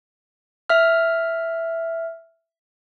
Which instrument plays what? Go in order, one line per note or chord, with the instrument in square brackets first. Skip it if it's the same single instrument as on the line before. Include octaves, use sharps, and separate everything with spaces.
[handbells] E5 F6